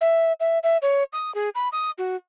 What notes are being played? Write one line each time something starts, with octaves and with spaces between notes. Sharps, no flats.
E5
E5
E5
C#5
D#6
G#4
B5
D#6
F#4